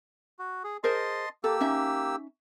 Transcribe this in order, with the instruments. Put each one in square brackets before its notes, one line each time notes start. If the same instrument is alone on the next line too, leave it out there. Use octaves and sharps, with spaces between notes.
[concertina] F#4
G#4
[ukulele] G#4 A#4 C5 [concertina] D#5 A5 C6
[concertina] A#3 G4 E6 [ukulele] A4
[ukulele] C#4 D#4 E5